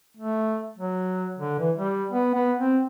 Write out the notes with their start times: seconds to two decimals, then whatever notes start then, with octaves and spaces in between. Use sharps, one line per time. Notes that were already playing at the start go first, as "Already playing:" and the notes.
0.17 A3
0.78 F#3
1.39 D3
1.59 E3
1.77 G3
2.12 B3
2.35 B3
2.59 C4